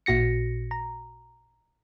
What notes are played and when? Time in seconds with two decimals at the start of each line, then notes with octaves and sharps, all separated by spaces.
0.06 A1 A#2 F#4 A#6 C#7
0.71 A#5